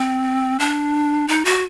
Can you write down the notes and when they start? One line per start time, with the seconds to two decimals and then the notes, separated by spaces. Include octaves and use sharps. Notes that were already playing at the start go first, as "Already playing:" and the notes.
Already playing: C4
0.60 D4
1.28 D#4
1.45 F#4